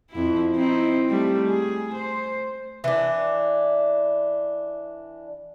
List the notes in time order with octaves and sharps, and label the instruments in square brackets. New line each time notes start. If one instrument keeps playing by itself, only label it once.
[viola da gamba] F2 E4
C4 D#4 E4
G3 A3
G#4
C5
[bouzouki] E3 D4